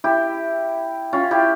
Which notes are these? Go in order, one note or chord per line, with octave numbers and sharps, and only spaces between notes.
E4 G4
C#4 F4
E4 G4